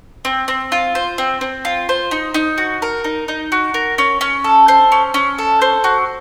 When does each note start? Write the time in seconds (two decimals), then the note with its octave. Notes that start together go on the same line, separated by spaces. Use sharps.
0.25 C4
0.48 C4
0.72 F4
0.95 C5
1.18 C4
1.41 C4
1.65 F4
1.89 C5
2.11 D#4
2.34 D#4
2.58 F#4
2.82 A#4
3.04 D#4
3.28 D#4
3.52 F#4
3.74 A#4
3.98 C#4
4.21 C#4
4.44 A4
4.68 C5
4.92 C#4
5.14 C#4
5.39 A4
5.62 C5
5.84 F#4